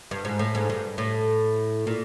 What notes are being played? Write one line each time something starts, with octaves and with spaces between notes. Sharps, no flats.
G2
G#2
A2
G#2
G2
A2
A#2